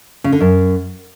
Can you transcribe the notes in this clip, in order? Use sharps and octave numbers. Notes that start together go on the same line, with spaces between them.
C#3
D3
F#2